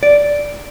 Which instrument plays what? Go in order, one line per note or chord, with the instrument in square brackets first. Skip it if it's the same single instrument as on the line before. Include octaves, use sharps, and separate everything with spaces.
[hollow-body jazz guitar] D5